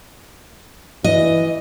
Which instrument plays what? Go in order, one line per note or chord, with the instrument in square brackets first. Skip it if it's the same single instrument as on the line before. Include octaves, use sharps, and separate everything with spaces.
[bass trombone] E3 [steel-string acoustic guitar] D#5